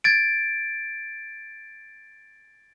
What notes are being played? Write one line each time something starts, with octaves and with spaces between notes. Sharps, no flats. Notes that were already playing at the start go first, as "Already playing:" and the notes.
G#6 A6 D7